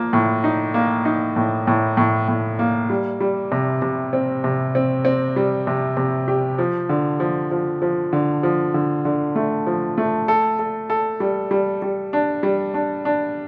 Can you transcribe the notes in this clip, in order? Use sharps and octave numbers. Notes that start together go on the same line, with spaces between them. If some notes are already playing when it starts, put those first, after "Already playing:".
Already playing: F3 A#3
A2
D#4
A#3
D#4
A2
A2
A2
A2
A#3
G3
G3
C3
C3
C4
C3
C4
C4
G3
C3
C3
G4
F3
D3
F3
F3
F3
D3
F3
D3
D3
A3
F3
A3
A4
A4
A4
G3
G3
G3
D4
G3
D4
D4